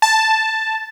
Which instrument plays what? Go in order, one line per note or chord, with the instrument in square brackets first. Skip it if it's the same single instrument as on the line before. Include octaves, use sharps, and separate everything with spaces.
[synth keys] A5